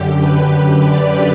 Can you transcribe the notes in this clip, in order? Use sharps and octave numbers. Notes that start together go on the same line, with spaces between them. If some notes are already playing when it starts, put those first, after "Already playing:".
Already playing: F#2 D3 G4
B4
D5